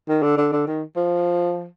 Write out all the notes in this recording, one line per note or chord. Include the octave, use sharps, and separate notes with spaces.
D#3
D3
D3
D3
D#3
F3